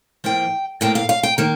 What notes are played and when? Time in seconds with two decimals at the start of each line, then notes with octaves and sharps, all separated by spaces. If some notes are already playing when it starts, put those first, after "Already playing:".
0.24 A2 F3 A#3 G5
0.81 A2 F3 A#3 G5
0.95 F5
1.09 F5
1.23 G5
1.38 D#3 A#3